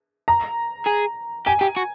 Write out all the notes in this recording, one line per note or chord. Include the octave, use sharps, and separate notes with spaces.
A#5
G#4
G4 G#5
G4
F#4